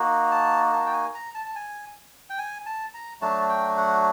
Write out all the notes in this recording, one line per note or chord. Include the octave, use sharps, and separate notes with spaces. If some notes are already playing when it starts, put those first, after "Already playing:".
Already playing: A#3 D#4 F#4
A5
A5
G5
G#5
A#5
A5
A5
G#5
G5
G#5
A5
A#5
F#3 A3 D4 F#4 A5
G5
F#5